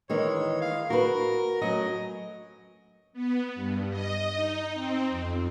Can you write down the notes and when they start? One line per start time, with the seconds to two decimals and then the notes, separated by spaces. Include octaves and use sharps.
0.10 D#3 E3 G#3 C#5
0.61 F5
0.90 F#4 A#4 B4
1.61 F#3 A3 C#4 D#5
3.13 B3
3.55 G2
3.90 D#5
4.34 D#4
4.74 C4
5.09 F2